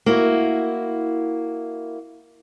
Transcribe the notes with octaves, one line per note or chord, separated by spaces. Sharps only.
A#3 E4 F#4